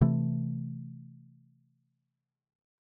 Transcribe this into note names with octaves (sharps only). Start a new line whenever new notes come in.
C3 E3 A3